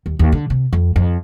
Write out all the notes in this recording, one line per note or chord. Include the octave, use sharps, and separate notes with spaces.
D#2
D#2
D3
C3
F2
F2